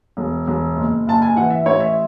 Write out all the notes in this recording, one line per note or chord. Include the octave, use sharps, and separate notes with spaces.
E1
E1
F#1
F#1 A5
G#5
E3 F#5
E5
A1 C#5
E5